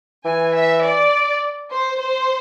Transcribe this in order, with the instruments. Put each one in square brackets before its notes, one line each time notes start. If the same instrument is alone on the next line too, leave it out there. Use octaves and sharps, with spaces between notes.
[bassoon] E3 [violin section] G#5
[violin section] E5
D5
C5
C5